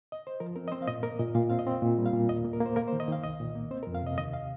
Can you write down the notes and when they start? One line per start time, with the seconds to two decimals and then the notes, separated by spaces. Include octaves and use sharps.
0.12 D#5
0.27 C5
0.40 F3 A#4
0.56 C4 A#4
0.68 D#5
0.72 C4 C5
0.82 F5
0.88 A#2 D#5
1.03 A#3 A#4
1.19 A#2 D#5
1.35 A#2 F5
1.50 C4 F5
1.59 D#5
1.67 C4
1.82 A#2
1.98 G3
2.06 F5
2.13 A#2
2.29 D#2 D#5
2.45 A#3
2.53 A#4
2.60 A#3
2.66 C5
2.76 A#3 A#4
2.88 C5
2.93 D#3
3.00 D#5
3.08 D#3 F5
3.23 C2 D#5
3.40 A#2
3.55 A#3
3.71 C4 C5
3.83 A#4
3.87 F2
3.95 F5
4.03 C3 D#5
4.18 D#2 D#5
4.33 F5